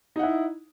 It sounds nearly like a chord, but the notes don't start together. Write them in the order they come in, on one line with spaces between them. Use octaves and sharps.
D#4 F#5 E4